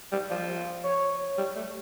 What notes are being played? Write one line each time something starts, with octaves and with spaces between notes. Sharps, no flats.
G3
F3
C#5
G3
A3